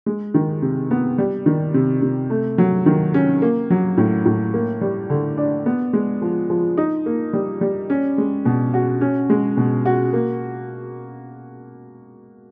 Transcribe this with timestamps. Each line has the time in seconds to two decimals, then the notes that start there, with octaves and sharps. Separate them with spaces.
0.06 G#3
0.34 D#3
0.62 C3
0.91 B3
1.18 G3
1.46 D#3
1.74 C3
2.02 C3
2.30 A3
2.58 F#3
2.86 D#3
3.14 C#4
3.42 A#3
3.70 F#3
3.98 A2
4.26 A2
4.54 A#3
4.81 G3
5.10 D3
5.37 D4
5.66 B3
5.93 G#3
6.22 F3
6.50 F3
6.77 D#4
7.06 A#3
7.33 G3
7.61 G3
7.90 C#4
8.18 G#3
8.45 B2
8.74 F#4
9.01 C#4
9.30 G#3
9.57 B2
9.86 F#4
10.13 A#3